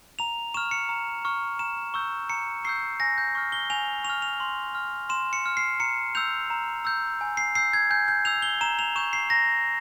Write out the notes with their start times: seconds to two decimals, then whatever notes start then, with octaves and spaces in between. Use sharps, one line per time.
0.19 A#5 F7
0.54 C#6 E7
0.57 F6
0.71 C#7
0.89 A#5
1.25 C#6 F6
1.59 A#5 E7
1.94 C#6 E6 G6
2.29 A#5 C#7
2.64 C#6 E6 G6 C7
3.00 G#5 A#6
3.18 G6
3.35 C#6 F6
3.52 G7
3.70 G#5 F7
4.04 C#6 F7
4.10 F6
4.22 F7
4.40 C6
4.75 F6
5.09 C6 E7
5.33 C#7
5.46 F6
5.57 C7
5.80 A#5 C#7
6.15 E6 G6 F7
6.50 A#5
6.85 E6 G6
7.21 G#5
7.37 C7
7.55 E6 G6 C7
7.73 G#6
7.90 G#5 G6
8.08 G6
8.25 E6 G6 F7
8.42 G7
8.61 A#5 E7
8.79 F7
8.96 C#6 G6 E7
9.13 C7
9.30 A#5 A#6